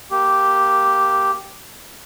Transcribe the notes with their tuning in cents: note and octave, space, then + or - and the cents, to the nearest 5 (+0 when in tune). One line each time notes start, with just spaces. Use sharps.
A#3 +0 G4 -5